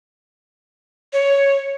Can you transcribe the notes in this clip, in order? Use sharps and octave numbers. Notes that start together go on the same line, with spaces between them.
C#5